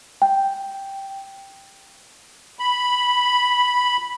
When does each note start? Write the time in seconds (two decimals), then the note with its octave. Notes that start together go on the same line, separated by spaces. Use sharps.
0.22 G5
2.59 B5